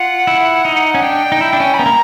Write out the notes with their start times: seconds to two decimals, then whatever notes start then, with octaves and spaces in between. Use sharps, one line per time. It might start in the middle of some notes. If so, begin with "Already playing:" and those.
Already playing: F4 F#5
0.27 E4
0.65 D#4
0.94 C#4
1.02 D4 G5
1.32 D#4
1.41 E4
1.53 D4
1.60 C#4
1.74 B5
1.78 B3 A#5
1.86 A#3